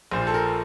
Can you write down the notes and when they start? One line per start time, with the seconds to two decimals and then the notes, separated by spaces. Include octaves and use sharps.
0.12 A#1 A#2 F3 C5
0.27 A4
0.34 A#4